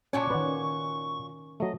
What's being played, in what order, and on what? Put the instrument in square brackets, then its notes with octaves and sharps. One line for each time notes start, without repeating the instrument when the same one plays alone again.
[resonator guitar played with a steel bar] A#2 F#4 C#5 [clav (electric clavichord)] C#4 G#5 A5 [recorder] C#6
[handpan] D#3 C#4 [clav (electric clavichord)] B4 D5 F#5
[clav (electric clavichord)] F#3 A3 [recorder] D#5